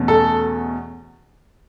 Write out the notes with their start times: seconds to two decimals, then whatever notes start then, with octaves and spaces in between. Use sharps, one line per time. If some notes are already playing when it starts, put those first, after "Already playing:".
Already playing: E2 B2 A3 C#4
0.08 A4